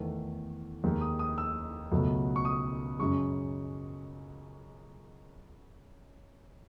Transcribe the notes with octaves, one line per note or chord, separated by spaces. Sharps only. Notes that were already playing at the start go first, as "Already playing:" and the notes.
Already playing: E2 D#3 A3
D#2 D#3 G#3 D#4
D#6
D#6
E6
C#2 B2 F#3 A3
C#6
D#6
F#2 C#3 G#3 C#6